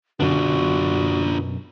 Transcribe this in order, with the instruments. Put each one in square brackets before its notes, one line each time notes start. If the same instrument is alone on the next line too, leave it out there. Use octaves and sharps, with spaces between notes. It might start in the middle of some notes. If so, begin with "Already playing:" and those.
[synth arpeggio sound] F#2 B2 [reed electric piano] D3 [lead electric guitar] D4 F4 [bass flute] F#4